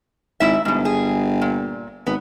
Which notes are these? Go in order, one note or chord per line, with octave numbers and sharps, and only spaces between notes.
G#1 G#2 E4 E5
G1 G#2 B2
G#4
A#2
G#1 B3